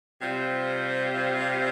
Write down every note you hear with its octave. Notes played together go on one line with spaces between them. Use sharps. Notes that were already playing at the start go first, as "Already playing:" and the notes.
C3 G3 C4 F4 C5